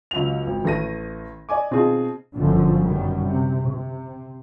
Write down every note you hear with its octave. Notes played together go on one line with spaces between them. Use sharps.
C#2 F#3 F7
G#1
A1 A3 A#6 D#7
D5 D#5 G#5 D6
B2 C4 D#4 F4 G#4
G1 F#2 B2 D3 F3
F#2 D#3 G3
C3
C3